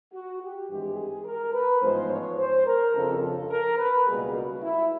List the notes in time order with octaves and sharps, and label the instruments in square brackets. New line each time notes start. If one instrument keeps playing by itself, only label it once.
[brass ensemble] F#4
G4
G#1 G2 E3 G#3 G4
G#4
A#4
B4
A1 G#2 F3 G#3 B3 C5
C#5
C5
A#4
G1 F2 C#3 A4
A4
A#4
B4
C#2 B2 G3 A#3 G#4
F#4
E4